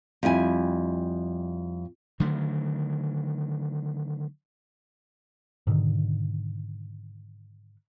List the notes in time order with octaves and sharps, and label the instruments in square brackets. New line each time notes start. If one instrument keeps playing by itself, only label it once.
[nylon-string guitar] F2 G3 E4 G#5
[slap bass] D3 D#3 F#3 A3
[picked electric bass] G#2 B2 D3 D#3